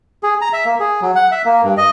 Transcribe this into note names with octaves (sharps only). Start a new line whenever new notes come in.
G#4
A#5
E5
A#3
G#4
F#3
F#5
E5
A#3
G2
D#5